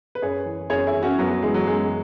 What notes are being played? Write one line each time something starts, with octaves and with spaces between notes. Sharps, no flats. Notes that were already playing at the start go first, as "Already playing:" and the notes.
B4
F#2 G#4 C#5
E3
F#2 G#4 C#5
E4 G#4
E3
C#4 F#4
F#2 F#3 B3
F#3
E3 G#3
F#3
F#2 G#3